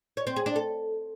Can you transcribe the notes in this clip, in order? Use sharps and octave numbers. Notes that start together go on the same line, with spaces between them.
C#5
C4
G#4
D4
A4